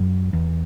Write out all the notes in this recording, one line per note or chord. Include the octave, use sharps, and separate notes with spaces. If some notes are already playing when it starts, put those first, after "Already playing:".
Already playing: F#2
E2